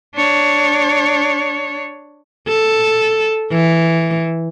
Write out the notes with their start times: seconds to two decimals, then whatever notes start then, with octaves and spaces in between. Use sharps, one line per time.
0.15 D4 C#5
2.48 A4
3.52 E3